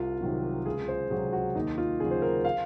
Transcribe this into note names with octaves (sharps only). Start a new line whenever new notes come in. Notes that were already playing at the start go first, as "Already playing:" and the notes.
Already playing: C2 F4
C3 D#3 F#3
C#2 G#4
C5
C3 F#3 G#4
F#4
D#2 D#4
F4
C#3 F#3 G#4
C5
A#4
F5